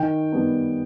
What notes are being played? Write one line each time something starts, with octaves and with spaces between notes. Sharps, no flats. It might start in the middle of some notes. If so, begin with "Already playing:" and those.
Already playing: D#3 G5
G3 B3